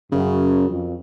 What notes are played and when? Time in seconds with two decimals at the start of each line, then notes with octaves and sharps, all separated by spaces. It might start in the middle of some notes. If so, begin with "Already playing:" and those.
0.12 F#2 C#3
0.68 F2